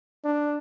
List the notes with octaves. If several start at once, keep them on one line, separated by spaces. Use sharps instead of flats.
D4